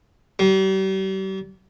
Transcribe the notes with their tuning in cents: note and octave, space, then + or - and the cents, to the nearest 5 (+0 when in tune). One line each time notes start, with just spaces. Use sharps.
G3 -40